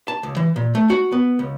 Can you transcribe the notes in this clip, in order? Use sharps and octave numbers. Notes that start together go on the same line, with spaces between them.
A5
C#2
E3
A#2
A3
F#4
B3
C#2